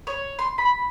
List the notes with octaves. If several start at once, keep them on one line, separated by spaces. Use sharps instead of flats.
C#5
C6
B5